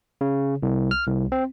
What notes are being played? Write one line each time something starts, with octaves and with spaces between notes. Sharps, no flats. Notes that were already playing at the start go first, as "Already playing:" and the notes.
C#3
C2
F6
C2
C4